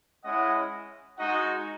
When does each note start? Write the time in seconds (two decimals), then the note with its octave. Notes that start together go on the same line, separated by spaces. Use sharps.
0.23 G#3 C#4 E4 D#5 F#5
1.17 G#3 D#4 F#4 D#5 F#5